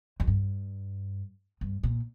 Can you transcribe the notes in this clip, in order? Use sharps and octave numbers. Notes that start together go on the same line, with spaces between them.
F2
G2
G2
A#2